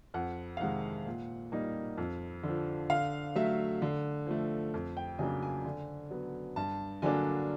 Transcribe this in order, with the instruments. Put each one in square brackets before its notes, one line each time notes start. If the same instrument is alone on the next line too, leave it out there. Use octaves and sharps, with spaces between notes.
[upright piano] F2 F#5
F5
C3 D#3 G#3 F#5
A#2
G3 A#3 D#4
F2
D3
F3
D3 F5
F#3 A3 E5
D3
F3 A3
F2
G5
C#3 F#3 A#3 D4 G#5
G#5
D3
F#3 B3
G2 A5
D3 F#3 A#3 D4 G#5